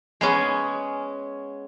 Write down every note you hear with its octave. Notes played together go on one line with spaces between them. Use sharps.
G#3 B3 C#4 G#4